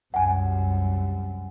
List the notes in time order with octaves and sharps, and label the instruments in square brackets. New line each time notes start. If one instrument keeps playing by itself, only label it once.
[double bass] C2 F#2 [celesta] F#5 G#5